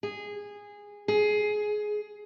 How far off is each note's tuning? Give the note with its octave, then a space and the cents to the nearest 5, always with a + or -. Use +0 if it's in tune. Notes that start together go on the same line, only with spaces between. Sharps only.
G#4 -15
G#4 +15